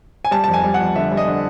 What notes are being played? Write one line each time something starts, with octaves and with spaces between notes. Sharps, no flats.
G#5
G3 A5
F2 A5
G#5
G3
F#5
F2
D3 E5
G3
D#5
D3